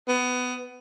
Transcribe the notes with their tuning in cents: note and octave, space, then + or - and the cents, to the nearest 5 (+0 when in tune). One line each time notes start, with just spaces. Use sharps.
B3 +15